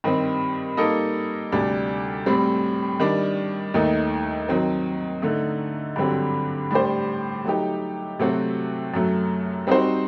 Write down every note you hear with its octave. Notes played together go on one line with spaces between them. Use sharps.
G2 D#3 G3 C4
G3 A#3 D#4 A4 D#5
D2 C3 G3 D4
A2 G3 C4
D#3 G3 D4
D#2 D#3 A3 D#4
D#3 F#3 C4
D3 A3 D#4
G2 D3 F#3 C4 G4
A2 G3 D4 G4 C5
F#3 A3 D#4 G4
C3 F#3 A3 C4 F#4
F#2 F#3 A3
G3 C4 D#4 F#4 C5